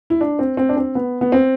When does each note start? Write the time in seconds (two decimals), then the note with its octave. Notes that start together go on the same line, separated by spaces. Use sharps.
0.10 E4
0.21 D4
0.39 C4
0.57 C4
0.69 D4
0.77 C4
0.95 B3
1.21 B3
1.32 C4